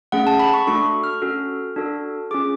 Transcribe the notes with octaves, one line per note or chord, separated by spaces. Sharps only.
A3 C#4 G#4 F#5
A5
B5
C#6
A3 D4 F#4 A4 C#6
F6
C#4 F#4 A4
D4 F#4 A4
C#4 F4 G#4 D6